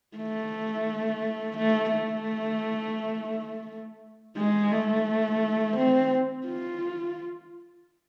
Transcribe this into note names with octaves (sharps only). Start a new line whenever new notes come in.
A3
A3
A3
G#3
A3
C4
F4